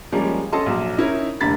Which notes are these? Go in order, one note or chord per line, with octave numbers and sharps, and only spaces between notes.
F3 G3 G#3 A#3 C#4
C#4 A4 D#5 A5 C6
A#1 F#3
C#4 D#4 E4 A#4 D#5
F1 D3 A#3 B5 A6 B6